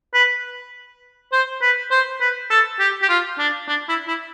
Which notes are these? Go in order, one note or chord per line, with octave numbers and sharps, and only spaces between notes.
B4
C5
B4
C5
B4
A4
G4
G4
F4
D4
D4
E4
E4